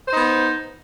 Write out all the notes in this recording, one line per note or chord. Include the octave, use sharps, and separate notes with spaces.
B3 D#4 C5